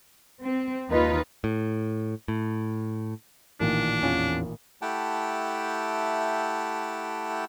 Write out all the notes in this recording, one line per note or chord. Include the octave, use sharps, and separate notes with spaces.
C4
D#2 D#4 F4 B4
A2
A2
A1 A#2 D#3 D4
E2 C#4 F4
A3 E4 G4 F#5 G5 A5